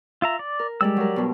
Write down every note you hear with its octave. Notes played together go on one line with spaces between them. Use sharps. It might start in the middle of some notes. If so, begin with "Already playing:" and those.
F4 E5 A#5
D5
A#4
G3 G#3 G4 D5 E6
F#3 A#4
G2 B2